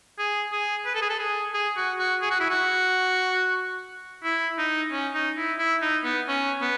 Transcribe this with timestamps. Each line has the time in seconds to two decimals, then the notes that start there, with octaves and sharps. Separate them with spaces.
0.19 G#4
0.52 G#4
0.86 B4
0.95 A4
1.02 G#4
1.10 A4
1.19 G#4
1.54 G#4
1.77 F#4
1.99 F#4
2.22 G#4
2.31 F#4
2.40 E4
2.50 F#4
4.24 E4
4.58 D#4
4.92 C#4
5.14 D#4
5.38 E4
5.59 E4
5.82 D#4
6.04 B3
6.28 C#4
6.61 B3